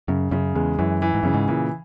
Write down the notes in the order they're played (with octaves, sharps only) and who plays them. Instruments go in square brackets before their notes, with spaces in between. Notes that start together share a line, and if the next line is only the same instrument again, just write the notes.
[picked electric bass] F#2 [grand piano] C#3
[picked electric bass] F#2 [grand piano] C#3
[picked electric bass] E2 [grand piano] G#3
[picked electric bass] F#2 [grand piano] E3
[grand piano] E3
[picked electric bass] G#2
[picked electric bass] F#2 [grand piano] C#3
[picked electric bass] G#2
[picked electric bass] A#2 [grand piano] E3